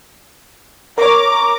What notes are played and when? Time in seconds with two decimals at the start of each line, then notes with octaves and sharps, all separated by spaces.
0.98 A#4 C#5 A#5 D6